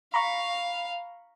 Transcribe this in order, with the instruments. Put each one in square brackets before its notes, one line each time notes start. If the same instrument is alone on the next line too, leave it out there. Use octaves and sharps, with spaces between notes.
[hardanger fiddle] F5 [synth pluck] A#5 B5 C#6